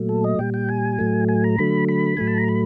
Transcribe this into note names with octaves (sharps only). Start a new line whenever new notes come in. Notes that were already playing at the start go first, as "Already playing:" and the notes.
Already playing: A#2 F#3 A3
A4
D#5
A#2 G3 G5
G5
G#5
A2 F#3 A3
G#5
A#5
D3 F#3 A3 B5
B5
A2 F#3 A3 G#5
A5
A#5
B5